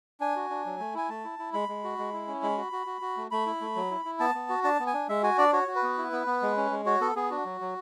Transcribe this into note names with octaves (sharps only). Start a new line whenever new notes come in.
D4 G#5
F#4
D4
F#3
A3
E4 G#5
A3 A5
E4
E4
G#3 B5
G#3
F#4
G#3
E4
C#4
G#3 B5
F#4
F#4
F#4
F#4
A3
A3 B5
E4
A3
F#3
E4
E4
B3 A5
B3
F#4
D4 A5
B3
G#5
D4
G#3 E5
F#4 G#5
D4 D5
F#4 C#5
F#4
B4
B3
E4
B3
B3
G#3
C#4
G#3
F#4 C#5
B3 A4
B3 G#4
D4 F#4
F#3
F#3